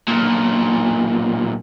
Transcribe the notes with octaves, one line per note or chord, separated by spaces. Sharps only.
B1 A#2